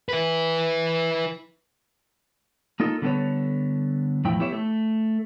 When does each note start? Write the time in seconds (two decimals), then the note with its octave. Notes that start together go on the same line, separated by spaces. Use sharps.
0.09 E4 B4
2.80 A#3 D#4 F4 A4
3.02 D3 G3 A3 B3 A4 C#5
4.25 E2 A2 F3 E4 G5
4.39 B3 E4 G4 C#5 E5
4.53 A3